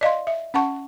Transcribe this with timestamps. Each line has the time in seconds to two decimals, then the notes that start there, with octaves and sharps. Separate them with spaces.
0.01 D5 D#5 F5 C6
0.27 E5
0.54 C#4 F#5 A5 C#6